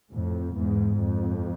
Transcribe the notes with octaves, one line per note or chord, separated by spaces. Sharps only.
F2 A2
E2 G#2
F2